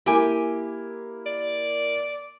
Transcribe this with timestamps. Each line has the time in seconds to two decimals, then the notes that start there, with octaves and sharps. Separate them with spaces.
0.06 A#3 E4 G4 G#5
1.26 D5